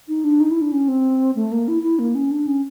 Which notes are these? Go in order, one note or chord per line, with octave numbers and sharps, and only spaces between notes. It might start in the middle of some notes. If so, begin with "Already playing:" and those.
D#4
D4
D#4
E4
D4
C#4
C4
A3
A#3
E4
E4
A#3
C#4
D4
C#4